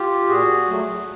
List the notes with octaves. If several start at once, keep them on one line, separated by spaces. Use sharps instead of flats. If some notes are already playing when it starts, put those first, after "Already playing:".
Already playing: F4 G4
A#2 F#4 G#4
F#3 A3